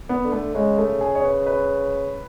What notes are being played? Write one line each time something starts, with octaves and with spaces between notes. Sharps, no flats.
B3
D3
A3
C#3 G#3
A3
G#4
C#5
B4
B4